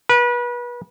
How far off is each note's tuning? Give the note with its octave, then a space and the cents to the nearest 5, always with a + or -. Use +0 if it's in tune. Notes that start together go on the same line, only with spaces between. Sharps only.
B4 -30